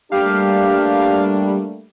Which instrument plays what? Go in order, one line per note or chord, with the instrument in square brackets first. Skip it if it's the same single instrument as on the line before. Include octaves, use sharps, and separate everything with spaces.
[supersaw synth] G3 [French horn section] A3 A#3 D4 [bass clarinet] G4 [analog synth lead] F5